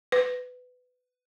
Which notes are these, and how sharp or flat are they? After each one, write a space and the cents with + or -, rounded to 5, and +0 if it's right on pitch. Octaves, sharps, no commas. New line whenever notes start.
B4 +20